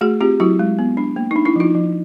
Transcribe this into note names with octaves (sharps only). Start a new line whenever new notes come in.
A3 F#4 G#4
C4 F4 G4
F#3 E4 F#4
G#3
B3
D4
A#3
D4 D#4
D4 E4
F3 D#4 F4
F3